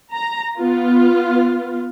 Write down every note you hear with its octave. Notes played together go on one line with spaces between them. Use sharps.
A#5
B3 F4